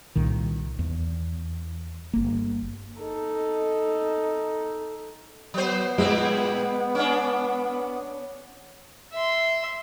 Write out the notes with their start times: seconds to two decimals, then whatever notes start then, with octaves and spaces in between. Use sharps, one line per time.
0.15 C2 A#2 D#3
0.79 E2
2.13 G1 A#3
3.01 D#4 A4
5.54 F#3 B3 C5
5.98 A#2 G#3 C4 E4
6.95 C#4 D4
9.13 E5 C6